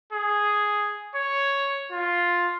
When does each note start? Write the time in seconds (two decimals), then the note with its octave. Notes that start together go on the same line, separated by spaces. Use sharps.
0.13 G#4
1.15 C#5
1.92 F4